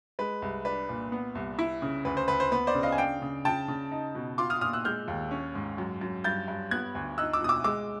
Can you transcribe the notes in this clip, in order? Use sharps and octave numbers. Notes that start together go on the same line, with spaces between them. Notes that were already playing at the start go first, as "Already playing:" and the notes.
G#3 B4
C2
D4 B4
A#2
B3
C2
E4
C#3
D2 B4
C5
D2 B4
C5
B3 B4
C5 D5
C#3
D#5 F5
G#5
D4 F5 G5
C#3
C#3 G5 A5
C#3
D#4
B2
F4 C6 D6
D#6 F6
A#2 D#6 F6
E6 F#6
G#3 F6 G6
D#2
C#4
G#2
F#2
F#2
G2 G6 A6
G2
B3 F#6 G#6
D2
D#4 E6 F#6
D6 E6
B2 D#6
D6 E6
G#3 D6 E6